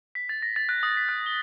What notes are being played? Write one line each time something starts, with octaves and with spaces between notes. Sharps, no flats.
B6
A6
A#6
A6
F#6
D#6
B6
F#6
G7